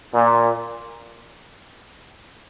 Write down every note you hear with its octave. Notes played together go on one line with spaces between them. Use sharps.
A#2